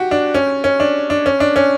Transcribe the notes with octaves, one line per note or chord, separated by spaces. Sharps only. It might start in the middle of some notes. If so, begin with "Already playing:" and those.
Already playing: F#4 G4
D4
C#4
C#4
D4
D4
C#4
D4
C#4